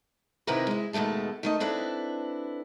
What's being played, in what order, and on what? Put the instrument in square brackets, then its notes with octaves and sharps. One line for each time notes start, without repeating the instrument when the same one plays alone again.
[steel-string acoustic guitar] C3 D#3 C4 E4 A#4 B4
G#3 E4
D#2 B2 G#3 A3 A4
D#3 A3 D#5
C4 D4 E4 A4 B4